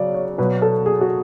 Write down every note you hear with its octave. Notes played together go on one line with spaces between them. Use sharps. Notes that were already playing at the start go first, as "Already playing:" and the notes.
Already playing: C#3 F#3 D5
C#5
B2 F#3 B4
A4
G#4
F#4